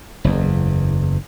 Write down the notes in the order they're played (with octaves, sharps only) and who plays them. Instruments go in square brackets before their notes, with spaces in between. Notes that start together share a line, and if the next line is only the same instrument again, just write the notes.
[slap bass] F#1 E2